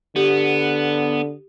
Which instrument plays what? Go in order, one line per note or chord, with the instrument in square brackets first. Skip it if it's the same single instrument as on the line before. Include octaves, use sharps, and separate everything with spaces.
[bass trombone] D3 [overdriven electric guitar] B3 [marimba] G4